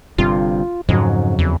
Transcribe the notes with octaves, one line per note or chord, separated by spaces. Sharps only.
G1 G2 C3 F4
F2 G#2 C#3 F#3
E2